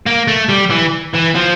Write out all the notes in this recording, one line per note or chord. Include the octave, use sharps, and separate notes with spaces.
A#3
A3
G3
E3
E3
F3